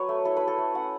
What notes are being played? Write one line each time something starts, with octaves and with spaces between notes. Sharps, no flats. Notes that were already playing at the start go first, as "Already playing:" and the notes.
Already playing: F#3 B4 C#5
A3
E4 A4
E4 B4
A4
A3
C#4 F#5